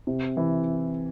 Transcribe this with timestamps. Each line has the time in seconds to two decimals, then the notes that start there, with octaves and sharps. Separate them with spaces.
0.07 C3
0.37 E3